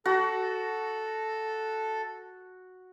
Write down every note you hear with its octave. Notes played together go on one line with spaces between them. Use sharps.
F#4 A4